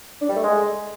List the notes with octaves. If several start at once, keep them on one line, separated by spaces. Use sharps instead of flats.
D4
G3
A3
G#3